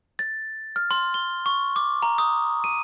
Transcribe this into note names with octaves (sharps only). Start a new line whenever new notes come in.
A6
F6
C6
G7
C#6
D6
A#5
D#6
D#7